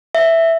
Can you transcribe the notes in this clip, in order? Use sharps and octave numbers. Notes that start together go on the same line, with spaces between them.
E5